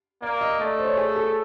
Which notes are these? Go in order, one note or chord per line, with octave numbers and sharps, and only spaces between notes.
A#3 D5
D#5
A3 D5
C5
C#5
G#4
A4